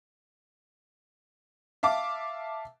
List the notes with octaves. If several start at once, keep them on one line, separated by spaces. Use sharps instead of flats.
E5 F5 A5 D6